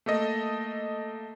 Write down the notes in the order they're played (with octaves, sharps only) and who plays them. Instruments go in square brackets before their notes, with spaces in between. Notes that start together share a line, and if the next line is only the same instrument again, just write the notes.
[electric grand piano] A3 A#3 A4 D#5